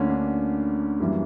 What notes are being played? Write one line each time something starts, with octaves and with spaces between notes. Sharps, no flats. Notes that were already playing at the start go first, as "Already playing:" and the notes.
Already playing: D2 D3 A#3 C#4
D4
F#2 E3 G3 A#3